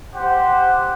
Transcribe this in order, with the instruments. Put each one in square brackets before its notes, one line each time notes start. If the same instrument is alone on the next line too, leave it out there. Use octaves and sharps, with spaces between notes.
[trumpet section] G4 C5 F#5